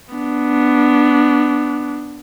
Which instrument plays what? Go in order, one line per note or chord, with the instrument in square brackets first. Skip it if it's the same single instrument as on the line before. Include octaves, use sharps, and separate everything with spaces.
[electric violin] B3 D4